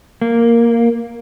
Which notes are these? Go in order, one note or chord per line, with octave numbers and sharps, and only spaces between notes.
A#3